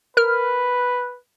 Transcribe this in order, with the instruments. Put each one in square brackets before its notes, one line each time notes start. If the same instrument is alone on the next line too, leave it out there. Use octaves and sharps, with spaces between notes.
[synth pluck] A#4 F6 [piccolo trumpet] B4